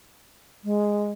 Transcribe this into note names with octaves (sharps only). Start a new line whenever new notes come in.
G#3